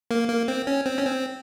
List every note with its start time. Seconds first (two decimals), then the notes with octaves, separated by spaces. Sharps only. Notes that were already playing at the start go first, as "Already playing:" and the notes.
0.11 A#3
0.29 A#3
0.48 C4
0.67 C#4
0.86 C4
0.98 C#4
1.05 C4